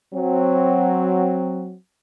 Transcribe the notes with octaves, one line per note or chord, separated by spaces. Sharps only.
F#3 C4